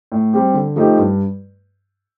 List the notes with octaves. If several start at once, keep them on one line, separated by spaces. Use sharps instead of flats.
A2
G3 C4 G4
D3
F3 A3 D#4 G4
G2